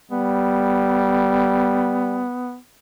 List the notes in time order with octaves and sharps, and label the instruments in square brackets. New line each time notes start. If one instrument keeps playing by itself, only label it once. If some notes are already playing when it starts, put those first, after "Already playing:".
[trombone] G3 [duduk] B3